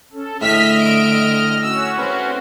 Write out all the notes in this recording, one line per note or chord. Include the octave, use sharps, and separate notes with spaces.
C#4 A4
A2 D3 D#5 E5 G5 F6 B6
E5 D7
C#4 F#4 E6
C4 B4 F#5